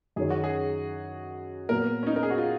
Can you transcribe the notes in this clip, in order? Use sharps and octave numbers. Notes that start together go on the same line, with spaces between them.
F#2 D#3 F#3 C#4 G#4
F#4
G#4
A#2 F#3 B3 A#4
C#4
D#4
A#4
G#4
F#4
F4